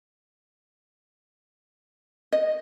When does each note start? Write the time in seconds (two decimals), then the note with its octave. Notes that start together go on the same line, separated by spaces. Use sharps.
2.32 D#5